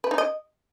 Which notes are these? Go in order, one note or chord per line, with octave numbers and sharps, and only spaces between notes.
B4
D#4
D#5